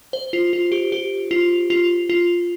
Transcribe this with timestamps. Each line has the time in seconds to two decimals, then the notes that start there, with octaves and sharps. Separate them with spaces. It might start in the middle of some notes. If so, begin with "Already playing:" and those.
0.13 C5
0.33 F4
0.53 F4
0.72 G4
0.92 G4
1.31 F4
1.70 F4
2.09 F4